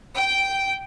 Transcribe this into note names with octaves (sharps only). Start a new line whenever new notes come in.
G5